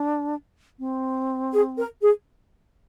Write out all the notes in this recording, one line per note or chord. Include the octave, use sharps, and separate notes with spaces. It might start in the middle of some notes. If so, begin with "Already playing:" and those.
Already playing: D4
C4
G#4
A#4
G#4